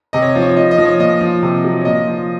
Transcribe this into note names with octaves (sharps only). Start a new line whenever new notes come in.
C3 D#5
C#5
F3
C#5
F3 D#5
D#5
F3
C#5
A#2 D#5
F3
C3
F#3
C#5
A#2 D#5
F3